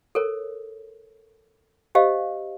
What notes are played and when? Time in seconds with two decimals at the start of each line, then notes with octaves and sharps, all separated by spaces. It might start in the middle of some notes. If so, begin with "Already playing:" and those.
0.15 A4 A#4 C#5
1.95 G4 C5 D#5 F5